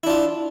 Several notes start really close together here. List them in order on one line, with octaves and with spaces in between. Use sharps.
E4 D4 F4